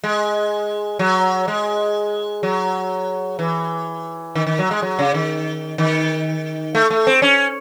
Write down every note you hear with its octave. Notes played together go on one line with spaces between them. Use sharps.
G#3
F#3
G#3
F#3
E3
D#3
D#3
F#3
G#3
F#3
C#3
D#3
D#3
A3
A3
C4
C#4